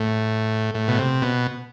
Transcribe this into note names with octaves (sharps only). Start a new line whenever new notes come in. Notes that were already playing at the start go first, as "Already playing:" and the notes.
Already playing: A2
A2
B2
C3
B2